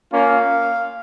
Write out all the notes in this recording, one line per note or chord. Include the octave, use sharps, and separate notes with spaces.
A#3 C#4 F4 F5